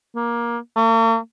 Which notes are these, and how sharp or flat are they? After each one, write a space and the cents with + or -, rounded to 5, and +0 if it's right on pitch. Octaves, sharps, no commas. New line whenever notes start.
A#3 +20
A#3 -45